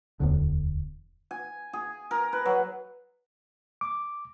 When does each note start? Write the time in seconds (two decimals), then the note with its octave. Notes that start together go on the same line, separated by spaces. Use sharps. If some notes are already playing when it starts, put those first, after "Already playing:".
0.20 D1 E2 D3
1.31 G#5
1.73 G#4
2.11 A#4
2.33 B4
2.46 F#3
3.81 D6